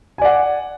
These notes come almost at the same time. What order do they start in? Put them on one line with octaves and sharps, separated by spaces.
G#5 D5 F#5